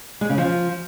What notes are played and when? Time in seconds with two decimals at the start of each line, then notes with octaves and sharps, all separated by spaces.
0.21 G#3
0.29 C#3
0.38 F3